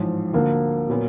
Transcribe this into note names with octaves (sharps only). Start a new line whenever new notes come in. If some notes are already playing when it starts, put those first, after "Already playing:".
Already playing: A1 G#2 F3
D2 D3 F3 A#3
A#2 F#3 B3